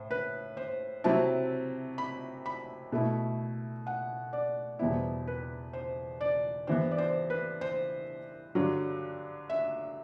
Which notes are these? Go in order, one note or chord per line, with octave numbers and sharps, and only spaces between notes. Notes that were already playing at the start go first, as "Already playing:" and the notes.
Already playing: A2 C5
B4
C5
C3 F#3 C4 E4 A5
B5
B5
B2 A3 E4
F#5
D5
E2 B2 G3 B3 E4 C5
B4
C5
D5
G2 E3 B3 C5
D5
C5
B4
C5
G2 D3 F#3
E5